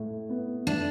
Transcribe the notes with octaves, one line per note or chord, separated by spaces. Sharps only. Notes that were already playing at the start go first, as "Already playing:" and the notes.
Already playing: A2
B3
A3 D4